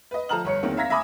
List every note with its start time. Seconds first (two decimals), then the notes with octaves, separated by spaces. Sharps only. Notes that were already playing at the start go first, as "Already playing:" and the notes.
0.11 B4 D#5
0.29 F3 A4 A5 A#5 F6 F#7
0.45 G1 C#5 C#7
0.63 E2 D#3 A#3 C4
0.77 E5 F5 A#5 G#6 A#6 B6
0.90 E5 G#5 A#5 B5 D6 D#6